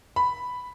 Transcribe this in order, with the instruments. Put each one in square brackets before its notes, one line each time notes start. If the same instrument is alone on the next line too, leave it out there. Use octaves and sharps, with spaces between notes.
[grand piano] B5